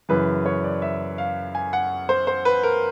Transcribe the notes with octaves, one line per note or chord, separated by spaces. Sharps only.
F#2 C#3 E3 B4
C#5
D5
E5
F5
G#5
F#5
C5
C5
B4
A#4